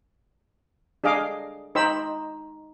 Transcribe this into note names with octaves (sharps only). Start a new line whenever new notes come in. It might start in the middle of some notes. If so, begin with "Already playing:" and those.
D4 G#4 D#5 F5 D6
D#4 C5 G5 B5 E6